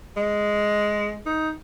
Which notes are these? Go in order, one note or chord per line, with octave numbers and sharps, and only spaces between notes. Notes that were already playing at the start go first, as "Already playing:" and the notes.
G#3
D#4